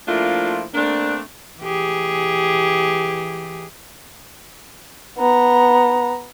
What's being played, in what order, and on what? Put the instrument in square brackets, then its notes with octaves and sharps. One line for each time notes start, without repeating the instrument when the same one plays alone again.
[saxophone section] F3 A3 A#3 D4 E4 F4
A3 A#3 C4 D4
[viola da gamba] E3 G4 G#4
[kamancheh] B3 A#5